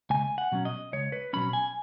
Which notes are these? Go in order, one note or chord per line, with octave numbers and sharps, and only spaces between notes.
C#2 G#5
F#5
B2 F#3 C#4
D#5
C#2 C#5
B4
B2 F#3 C#4 B5
G#5